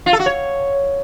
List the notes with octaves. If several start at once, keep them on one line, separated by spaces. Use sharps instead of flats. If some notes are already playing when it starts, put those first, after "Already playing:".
F4
A4
F#4
C#5